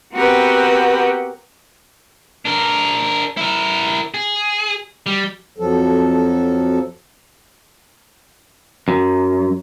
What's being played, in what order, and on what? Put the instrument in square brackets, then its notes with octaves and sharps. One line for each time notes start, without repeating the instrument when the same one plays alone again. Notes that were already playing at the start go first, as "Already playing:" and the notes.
[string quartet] B3 C4 F#4 G4 A#4 B4
[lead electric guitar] D4 A#4
E4 A#4
G#4
G3
[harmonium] F2 F3 F#3 A4
[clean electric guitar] F#2